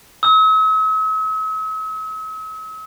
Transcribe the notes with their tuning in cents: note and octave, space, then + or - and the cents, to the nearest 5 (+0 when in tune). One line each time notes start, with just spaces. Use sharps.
E6 -45